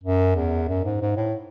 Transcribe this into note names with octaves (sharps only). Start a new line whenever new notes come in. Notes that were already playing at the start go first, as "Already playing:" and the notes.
F#2
E2
F#2
G#2
G#2
A2